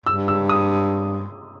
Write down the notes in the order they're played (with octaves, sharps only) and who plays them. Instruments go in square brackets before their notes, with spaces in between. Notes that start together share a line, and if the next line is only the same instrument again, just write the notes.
[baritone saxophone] G2 [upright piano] E6
[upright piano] E6
D#6